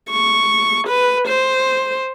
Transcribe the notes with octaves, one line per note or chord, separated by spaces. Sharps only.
C#6
B4
C5